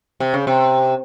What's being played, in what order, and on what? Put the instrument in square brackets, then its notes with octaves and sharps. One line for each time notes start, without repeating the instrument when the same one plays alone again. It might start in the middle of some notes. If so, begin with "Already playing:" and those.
[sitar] C3
C#3
C3